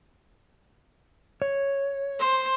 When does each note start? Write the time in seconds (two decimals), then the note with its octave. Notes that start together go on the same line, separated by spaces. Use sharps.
1.42 C#5
2.19 C5